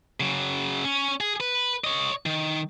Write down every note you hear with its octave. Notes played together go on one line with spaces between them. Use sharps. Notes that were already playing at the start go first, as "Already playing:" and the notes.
C#3 F#3
C#4
G#4
B4
C#5 D#5
D#3